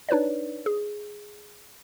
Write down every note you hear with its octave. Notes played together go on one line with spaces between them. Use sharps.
D4 D#4 B4 C#5 D5
G#4